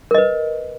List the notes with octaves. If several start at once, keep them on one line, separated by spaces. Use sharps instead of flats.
A#4 B4 D#5